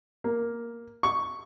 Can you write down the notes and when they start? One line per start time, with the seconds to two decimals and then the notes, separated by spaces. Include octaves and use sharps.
0.24 A#3
1.03 C#6